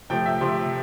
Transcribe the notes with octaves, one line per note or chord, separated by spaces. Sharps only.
C3 F3 A3 G5
E5
C3 F3 A3 C6